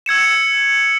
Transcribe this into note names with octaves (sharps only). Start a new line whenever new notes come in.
E6 G#6 C#7 E7